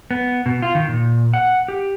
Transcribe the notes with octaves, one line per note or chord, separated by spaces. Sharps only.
B3
B2
F4
D#3
A#2
F#5
G4